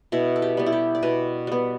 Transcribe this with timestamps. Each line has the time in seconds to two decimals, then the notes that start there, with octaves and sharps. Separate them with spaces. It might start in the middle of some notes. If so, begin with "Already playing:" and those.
0.12 B2 E4
0.36 A4
0.42 G4
0.57 G3 B3
0.66 E4
0.72 G4
0.95 D5
1.03 B2 B4
1.47 G3 B3